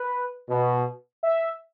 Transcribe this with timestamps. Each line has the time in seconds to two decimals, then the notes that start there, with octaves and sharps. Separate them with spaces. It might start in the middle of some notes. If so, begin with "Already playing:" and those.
Already playing: B4
0.48 B2
1.23 E5